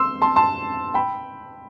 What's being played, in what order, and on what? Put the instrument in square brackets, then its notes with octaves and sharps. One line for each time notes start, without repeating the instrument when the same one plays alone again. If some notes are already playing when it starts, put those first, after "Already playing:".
Already playing: [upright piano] C6 E6
A5 C6
A5 C6
G5 B5